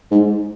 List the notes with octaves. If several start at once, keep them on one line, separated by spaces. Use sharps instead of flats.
G#2